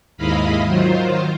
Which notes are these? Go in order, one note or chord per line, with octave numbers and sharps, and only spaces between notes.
D#2 G#2 E4 D#5 F5 B5
D#3 F#3 F4 C5